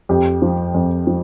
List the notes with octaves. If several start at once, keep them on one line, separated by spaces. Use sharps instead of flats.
F2 G4
F3
F2
F3